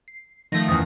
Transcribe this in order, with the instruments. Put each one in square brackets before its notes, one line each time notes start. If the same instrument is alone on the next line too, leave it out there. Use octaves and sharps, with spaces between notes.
[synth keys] C7
[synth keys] D#3 F3 A3 [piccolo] A#6
[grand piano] F#1 E2 [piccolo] D#6